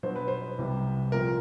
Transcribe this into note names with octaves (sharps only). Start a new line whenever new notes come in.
B2 F#3 B3 D4 C5
B4
C5
C2 C3 E3 G3
A#2 F3 A3 C4 A#4